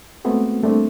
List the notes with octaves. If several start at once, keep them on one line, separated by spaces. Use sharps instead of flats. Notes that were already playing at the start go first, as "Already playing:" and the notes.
G#3 A3 B3 C4 F#4
G3 A3 A#3 C4 D4